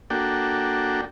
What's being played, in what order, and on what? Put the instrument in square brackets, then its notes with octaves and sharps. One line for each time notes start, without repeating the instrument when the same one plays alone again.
[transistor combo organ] A#3 D4 F#4 A4 G5